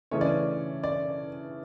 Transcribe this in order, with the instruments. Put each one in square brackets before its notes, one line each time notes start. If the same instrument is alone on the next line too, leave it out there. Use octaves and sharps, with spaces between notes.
[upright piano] C#3 E3 A3 C#4 C#5
D5
C#5
D5